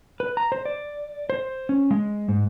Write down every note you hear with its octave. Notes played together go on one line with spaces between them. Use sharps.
B4
A#5
C5
D5
C5
C#4
G#3
G#2